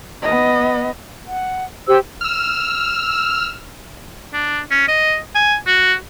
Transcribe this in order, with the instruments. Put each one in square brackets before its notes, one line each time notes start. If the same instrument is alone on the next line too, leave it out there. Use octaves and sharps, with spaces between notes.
[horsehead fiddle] B3 D#5
[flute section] F#5
G4 C5 E6
[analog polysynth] E6 F6
[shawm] D4
C#4
D#5
G#5
F#4